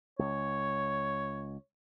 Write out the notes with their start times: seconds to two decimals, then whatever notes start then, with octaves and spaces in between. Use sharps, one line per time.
0.19 C#2 C#5